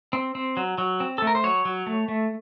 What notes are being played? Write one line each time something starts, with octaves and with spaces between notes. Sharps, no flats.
C4
C4
F#3
F#3
C4
A4
A3
A#4
C5
F#3 C#5
F#3
A3
A3